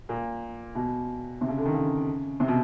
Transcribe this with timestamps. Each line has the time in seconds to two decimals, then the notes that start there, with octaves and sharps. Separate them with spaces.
0.09 A#2
0.75 B2
1.41 C3
1.49 C#3
1.57 D3
1.65 D#3
1.74 C#3
2.40 C3
2.48 B2